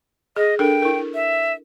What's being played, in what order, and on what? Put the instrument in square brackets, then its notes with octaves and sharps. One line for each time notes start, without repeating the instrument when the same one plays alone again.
[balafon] G#4 [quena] D#5
[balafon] D4 A4 A#4 [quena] G5
[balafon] E4 A#4
[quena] E5